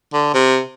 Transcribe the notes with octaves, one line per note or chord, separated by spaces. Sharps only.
D3
C3